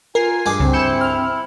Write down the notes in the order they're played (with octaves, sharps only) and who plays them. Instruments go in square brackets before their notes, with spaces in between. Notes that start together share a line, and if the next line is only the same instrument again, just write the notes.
[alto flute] F4 [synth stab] A#4 C7 [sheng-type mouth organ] G#5
[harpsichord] G2 G#4 D6
[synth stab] C#2 [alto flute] C4
[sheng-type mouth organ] E4 [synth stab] G6 C#7 E7
[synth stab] F6